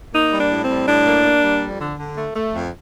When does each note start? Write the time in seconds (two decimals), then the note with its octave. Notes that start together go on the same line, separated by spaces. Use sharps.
0.13 A#3 D#4
0.33 G3
0.38 D4
0.50 A2
0.63 C4
0.69 G3
0.88 A2 D4
1.06 A#3
1.24 A#3
1.43 G3
1.62 F2
1.80 D3
1.99 D3
2.17 A3
2.36 A3
2.54 F2